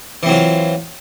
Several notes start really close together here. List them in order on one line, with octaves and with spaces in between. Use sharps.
E3 C4 F#3 F4